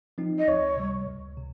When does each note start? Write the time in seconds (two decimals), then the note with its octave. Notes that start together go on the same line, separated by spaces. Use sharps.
0.18 F3 C4 D#4
0.38 D#5
0.47 C#2 C#5
0.77 C3 G3
1.07 C#2
1.37 C3